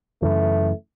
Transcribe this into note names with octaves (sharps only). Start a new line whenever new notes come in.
F#2 C#3 E3 A3